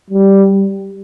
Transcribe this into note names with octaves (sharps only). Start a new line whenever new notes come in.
G3